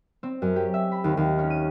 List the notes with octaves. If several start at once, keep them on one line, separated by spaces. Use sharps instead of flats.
C4
F#2
G4
E5
B5
D#2
D#2
C#4
D#7